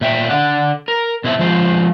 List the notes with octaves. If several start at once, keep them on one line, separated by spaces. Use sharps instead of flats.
A#2 E5 G5
D3 D5 F#5
A#4
B2 C4 E4 G4 A4 E5
F3 G#3 C4 C5